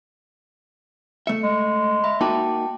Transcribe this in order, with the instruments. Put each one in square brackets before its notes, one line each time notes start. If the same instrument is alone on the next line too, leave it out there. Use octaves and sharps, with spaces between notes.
[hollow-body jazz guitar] A3 E5 [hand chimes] C#7
[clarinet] G#3
[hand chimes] E5 B5
[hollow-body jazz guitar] A#3 D#4 F#4 [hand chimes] G5 A5 D6